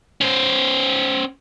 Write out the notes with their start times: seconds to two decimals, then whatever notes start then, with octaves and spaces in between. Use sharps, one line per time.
0.21 C#4 C5